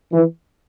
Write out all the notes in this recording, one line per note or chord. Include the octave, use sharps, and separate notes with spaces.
E3